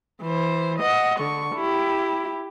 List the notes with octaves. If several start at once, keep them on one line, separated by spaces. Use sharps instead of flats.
E3 C5
D#5 F#5
D3 C#6
E4 G4